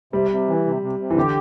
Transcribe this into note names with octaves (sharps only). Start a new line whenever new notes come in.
C3 G3
C3
E3
C3
C3
C3
E3
D3 G4